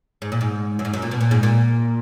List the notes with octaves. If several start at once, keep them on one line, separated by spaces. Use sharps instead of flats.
G#2
A#2
G#2
F#2
G#2
F#2
A#2
B2
A#2
G#2
A#2